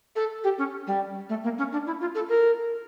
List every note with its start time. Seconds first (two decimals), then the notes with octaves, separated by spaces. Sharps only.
0.16 A4
0.44 G4
0.58 C#4
0.87 G3
1.29 A3
1.44 A#3
1.58 C#4
1.73 D4
1.87 E4
2.01 F4
2.15 A4
2.29 A#4